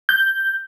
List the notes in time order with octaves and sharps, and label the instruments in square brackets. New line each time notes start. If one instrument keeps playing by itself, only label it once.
[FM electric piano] G6